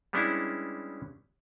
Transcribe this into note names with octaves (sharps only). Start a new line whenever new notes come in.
G3 G#3 B3 C#4 D4 E4